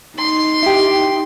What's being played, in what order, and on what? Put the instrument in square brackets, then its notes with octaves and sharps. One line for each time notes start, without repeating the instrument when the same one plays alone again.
[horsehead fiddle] D#4 [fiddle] C6
[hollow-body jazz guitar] E4 G4